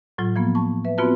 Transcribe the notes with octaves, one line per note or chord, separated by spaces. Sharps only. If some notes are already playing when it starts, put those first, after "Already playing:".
A2 F#3 F4
F3 A#3 B3
A5 C#6
B4 E5
B3 C4 F4 F#4 B4 A5